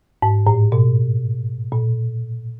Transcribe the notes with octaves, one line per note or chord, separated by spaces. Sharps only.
G#2
A2
B2
A#2